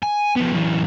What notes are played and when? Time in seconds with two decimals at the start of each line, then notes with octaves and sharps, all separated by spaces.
0.03 G#5
0.36 F3 B3
0.52 F#2 E3